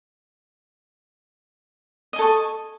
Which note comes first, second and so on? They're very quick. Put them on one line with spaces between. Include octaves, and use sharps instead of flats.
D#5 G#5 A4 C#6